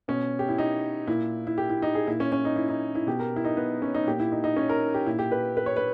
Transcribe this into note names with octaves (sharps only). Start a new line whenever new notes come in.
B2 C#4
G4
E4
D#4
A#2 E4
E4
G4
E4
D#4
G#4
A#2 E4
C#4
C#4
D#4
E4
D#4
E4
B2 G4
A#4
E4
D#4
B3
C#4
D#4
A#2 G4
E4
D#4
D#4
C#4
A#4
G4
A#2 E4
G4
B4
B4
C#5
B4